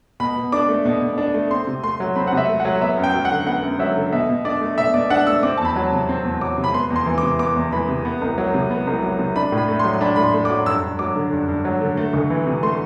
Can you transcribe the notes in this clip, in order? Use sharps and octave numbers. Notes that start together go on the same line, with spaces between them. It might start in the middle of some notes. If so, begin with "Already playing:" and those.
B2 B5
B2
D4 D6
A3
B2
B2
D4
A3
C4 C6
C3
A3 C6
F#3
C4 B5
F#5
C3 E5
A3
F#5
F#3
B3 E5
F#2
G5
F#3
F#5
D3
B3 F#5
F#2
F#3 E5
D3
B2 E5
B2
D4 D5
A3
B2 E5
B2 D5
D4 F#5
A3 E6
C4 D6
E2 A5
B5
F#3
C3
C4
E2
F#3 D6
C3
B5
B3 C6
E2
C6
E3
D6
C3
B3 D6
E2
E3 B5
C3
B3
C2
F#3
C3
B3
C2
F#3
C3
D4 B5
A2
B5
A3
C6
F#3
D4 B5
A2 B5
C6
A3
D6
F#3
G2 E6
G2
F#3 D6
D3
G2
G2
F#3
D3
A3
D2
E3
C3
A3 C6